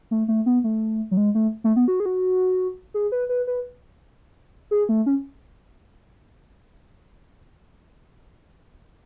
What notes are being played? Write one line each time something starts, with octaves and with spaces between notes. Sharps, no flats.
A3
A3
B3
A3
F#3
G#3
A3
A3
B3
F#4
G#4
F#4
G#4
B4
B4
B4
G#4
A3
C#4